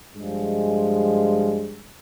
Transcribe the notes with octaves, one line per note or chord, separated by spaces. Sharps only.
G2 F3 G3 G#3